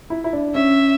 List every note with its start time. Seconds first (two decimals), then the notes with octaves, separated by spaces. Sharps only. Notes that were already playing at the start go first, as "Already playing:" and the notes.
0.10 E4
0.24 E4
0.33 D4
0.55 C#4 E5